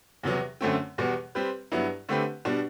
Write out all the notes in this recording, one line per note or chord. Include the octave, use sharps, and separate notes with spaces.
E2 C3 F#3 B3
F#2 D3 A3 C4
E2 B2 G3 B3
G3 C4 G4 B4
G2 F#3 B3 E4
D3 A3 C4 G4 B4
B2 G3 D4